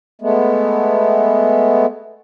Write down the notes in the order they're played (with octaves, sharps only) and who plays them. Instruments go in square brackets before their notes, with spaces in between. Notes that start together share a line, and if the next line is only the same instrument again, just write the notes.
[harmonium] G#3 A3 B3